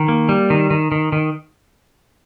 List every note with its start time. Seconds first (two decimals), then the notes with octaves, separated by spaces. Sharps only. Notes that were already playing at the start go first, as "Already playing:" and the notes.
Already playing: D#3
0.08 A#3
0.29 G3
0.50 D#3
0.71 D#3
0.92 D#3
1.12 D#3